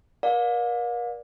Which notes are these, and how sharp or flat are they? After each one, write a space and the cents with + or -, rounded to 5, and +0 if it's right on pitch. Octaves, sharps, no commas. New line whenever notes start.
A#4 +40 D5 +0 F5 +40